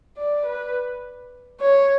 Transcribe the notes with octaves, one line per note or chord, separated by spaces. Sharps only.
D5
B4
C#5